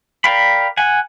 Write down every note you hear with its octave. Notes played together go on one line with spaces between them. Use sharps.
A#4 D5 F5 G5 B5
F#5 G#5